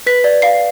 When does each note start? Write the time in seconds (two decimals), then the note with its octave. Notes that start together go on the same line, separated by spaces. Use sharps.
0.06 B4 B6
0.24 D5
0.42 F5 C7